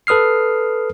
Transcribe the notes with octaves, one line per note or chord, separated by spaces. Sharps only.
A4 B4 D#6 F6 C7